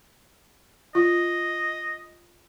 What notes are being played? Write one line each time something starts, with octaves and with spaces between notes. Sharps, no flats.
F4 D#5